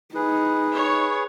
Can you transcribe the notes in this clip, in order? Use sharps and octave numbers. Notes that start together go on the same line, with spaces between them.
D#4 G#4 B4
C#5